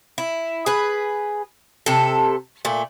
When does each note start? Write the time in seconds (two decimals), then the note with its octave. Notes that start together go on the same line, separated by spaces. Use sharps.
0.18 E4
0.66 G#4 B4
1.86 C3 A4
2.65 A#2 A3